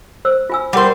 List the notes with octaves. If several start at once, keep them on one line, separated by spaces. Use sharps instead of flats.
C5 E6
F4 G#5 E6
G3 A#4 C5 F#5